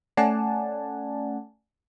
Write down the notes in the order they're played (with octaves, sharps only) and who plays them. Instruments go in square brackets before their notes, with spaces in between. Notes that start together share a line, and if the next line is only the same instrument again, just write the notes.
[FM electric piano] A3 C#4 D5 F#5 G#5 A5